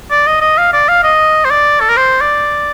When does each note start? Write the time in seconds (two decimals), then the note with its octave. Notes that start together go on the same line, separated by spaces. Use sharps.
0.10 D5
0.27 D#5
0.41 D#5
0.58 F5
0.73 D5
0.88 F5
1.04 D#5
1.45 C5
1.51 D5
1.80 A4
1.89 A#4
1.97 C5
2.21 D5